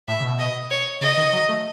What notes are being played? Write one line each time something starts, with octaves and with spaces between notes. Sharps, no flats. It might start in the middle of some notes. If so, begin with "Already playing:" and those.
A2 E5
C#3
B2
D#5
C#5
C#3 D#5
D#3
F#3
A3